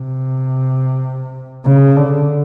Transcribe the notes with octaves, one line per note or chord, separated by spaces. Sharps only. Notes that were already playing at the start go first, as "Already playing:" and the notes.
Already playing: C3
C#3
D3